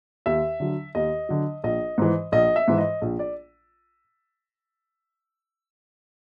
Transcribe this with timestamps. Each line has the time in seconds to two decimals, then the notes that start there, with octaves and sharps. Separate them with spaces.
0.26 D#2 E5
0.60 D3 F#3
0.95 D#2 D#5
1.29 D3 F#3
1.64 A#1 D#5
1.98 G#2 E3
2.32 A#1 D#5
2.56 E5
2.68 G#2 E3
2.78 D#5
3.02 A#1
3.19 D5